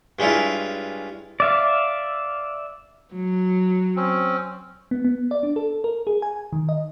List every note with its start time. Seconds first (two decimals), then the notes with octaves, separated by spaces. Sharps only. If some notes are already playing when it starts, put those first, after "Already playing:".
0.19 G2 G#3 C#4 E4 F4
1.40 D5 E5 F5
3.13 F#3
3.96 C4 C#4
4.91 B3
5.05 B3
5.31 D5
5.43 D4
5.56 A4
5.84 A#4
6.07 G#4
6.22 G#5
6.53 D#3
6.69 D#5